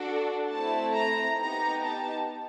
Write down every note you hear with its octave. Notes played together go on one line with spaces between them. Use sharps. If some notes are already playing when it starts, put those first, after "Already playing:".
Already playing: D4 F#4 A4
A3 C4 E4 A5
A#5
B3 D#4 G4 A#5
A5